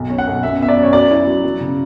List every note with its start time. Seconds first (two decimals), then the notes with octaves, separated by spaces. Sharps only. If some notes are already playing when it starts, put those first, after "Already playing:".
Already playing: B1
0.10 C#4
0.18 F#5
0.27 B1
0.43 F#2 E5
0.60 B3 E5
0.68 D5
0.77 F#2
0.83 C#5
0.93 F#3 D5
1.11 E4
1.27 F#3
1.44 F#3
1.60 C#3